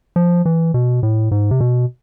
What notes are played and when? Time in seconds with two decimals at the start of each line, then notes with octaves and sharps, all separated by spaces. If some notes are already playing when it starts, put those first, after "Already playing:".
0.16 F3
0.45 E3
0.74 B2
1.03 A2
1.31 G#2
1.51 C3
1.60 B2